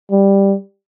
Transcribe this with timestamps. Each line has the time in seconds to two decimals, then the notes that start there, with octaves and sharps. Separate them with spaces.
0.11 G3